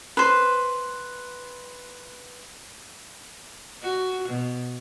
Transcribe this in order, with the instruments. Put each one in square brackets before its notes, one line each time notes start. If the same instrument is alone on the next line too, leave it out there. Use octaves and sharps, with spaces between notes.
[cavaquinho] B4 C5
[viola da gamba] F#4
B2